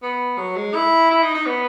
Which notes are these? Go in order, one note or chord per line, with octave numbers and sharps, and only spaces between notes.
B3
F#3
G#3
E4
E4
D#4
D#4
B3